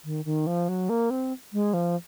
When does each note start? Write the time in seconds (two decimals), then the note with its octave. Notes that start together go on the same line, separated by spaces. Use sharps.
0.05 D#3
0.25 D#3
0.47 F3
0.69 F#3
0.89 A#3
1.10 C4
1.53 G#3
1.74 F3